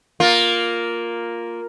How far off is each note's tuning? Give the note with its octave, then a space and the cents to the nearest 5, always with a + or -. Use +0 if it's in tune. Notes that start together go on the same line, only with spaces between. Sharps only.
A#3 +0 F4 +5